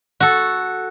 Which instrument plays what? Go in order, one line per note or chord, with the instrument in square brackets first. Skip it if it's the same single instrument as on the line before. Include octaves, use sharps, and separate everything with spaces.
[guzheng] F#4 A4